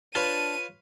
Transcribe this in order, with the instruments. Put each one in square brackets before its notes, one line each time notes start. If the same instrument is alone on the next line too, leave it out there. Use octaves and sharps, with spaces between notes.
[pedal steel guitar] D4 A5 [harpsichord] F4 B4 C#5 [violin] D#7